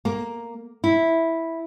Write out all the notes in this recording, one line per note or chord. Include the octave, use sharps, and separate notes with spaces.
A#3
E4